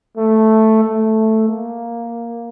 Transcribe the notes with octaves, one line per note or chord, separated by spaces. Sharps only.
A3
A3
A#3